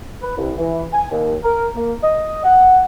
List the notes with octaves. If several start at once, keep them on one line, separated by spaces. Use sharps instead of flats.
B4
C2
E3
G#5
D#2
A#4
A#3
D#5
F#5